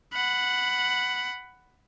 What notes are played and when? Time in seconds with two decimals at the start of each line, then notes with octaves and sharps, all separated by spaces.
0.14 F#5 B5